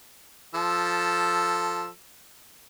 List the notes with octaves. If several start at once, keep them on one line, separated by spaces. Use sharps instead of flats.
F3 A4 E6